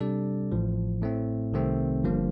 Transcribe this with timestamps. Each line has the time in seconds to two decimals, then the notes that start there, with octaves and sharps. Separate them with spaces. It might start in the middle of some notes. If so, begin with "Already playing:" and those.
0.01 C3 G3 D4 A4 D5
0.52 A1 A2 F3
1.01 A2 A3 C4
1.52 C2 C3 D#3 A3 C4
2.03 G1 G2 F3 A#3